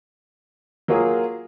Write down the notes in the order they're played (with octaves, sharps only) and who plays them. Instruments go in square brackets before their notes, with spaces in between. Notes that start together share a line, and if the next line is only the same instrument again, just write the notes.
[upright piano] F#3 A#3 F4 G#4